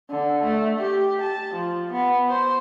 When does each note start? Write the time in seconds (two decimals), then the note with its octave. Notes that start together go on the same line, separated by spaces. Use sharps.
0.10 D3
0.43 A3
0.79 G4
1.21 A5
1.54 F3
1.92 B3
2.28 C5